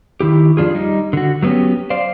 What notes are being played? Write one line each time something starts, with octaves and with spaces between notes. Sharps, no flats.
D#3 E4 G4
F2 E3 D4 F4 G#4
G3 D#4
D3 F#4
F#3 A3 B3 C#4 G4
C5 D5 F5